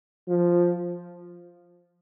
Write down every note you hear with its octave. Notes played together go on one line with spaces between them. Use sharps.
F3